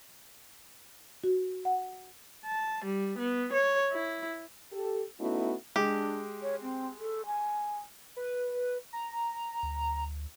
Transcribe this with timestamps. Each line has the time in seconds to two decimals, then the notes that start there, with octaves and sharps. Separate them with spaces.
1.24 F#4
1.65 F#5
2.46 A5
2.85 G3
3.18 B3
3.53 C#5
3.92 E4
4.71 G4 A4
5.20 A3 B3 C#4 D#4 E4 F#4
5.76 G#3 D4 G4
6.42 C#5
6.62 C4
6.99 A4
7.26 G#5
8.16 B4
8.93 A#5
9.63 D2